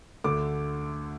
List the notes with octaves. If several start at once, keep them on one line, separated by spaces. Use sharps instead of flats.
D2 D3 A3 D6